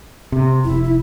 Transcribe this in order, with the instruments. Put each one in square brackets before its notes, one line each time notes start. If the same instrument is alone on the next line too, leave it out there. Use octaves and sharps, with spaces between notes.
[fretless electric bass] C3
[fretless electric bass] F1 [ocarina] E4
[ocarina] E4